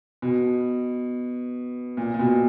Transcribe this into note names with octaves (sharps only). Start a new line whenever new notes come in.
B2
A#2
A#2
B2